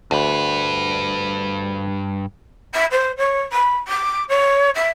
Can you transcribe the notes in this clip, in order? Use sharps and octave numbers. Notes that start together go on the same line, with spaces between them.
D2 G2 B4
E5
C5
C#5
B5
D6
C#5
E5